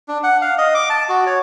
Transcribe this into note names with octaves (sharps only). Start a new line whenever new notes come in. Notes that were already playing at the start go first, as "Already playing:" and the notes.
D4
F#5
F5
D#5
D6
A5
F#4
C#5